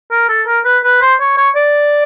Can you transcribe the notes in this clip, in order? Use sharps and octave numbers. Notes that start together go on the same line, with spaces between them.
A#4
A4
A#4
B4
B4
C5
C#5
C#5
D5